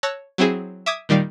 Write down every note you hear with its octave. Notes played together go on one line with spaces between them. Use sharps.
C#5 A5 E6 F#6 A#6
F#3 C4 E4 G#4
E5 D6 D#6 G#6
A#2 D#3 G3 D5 F5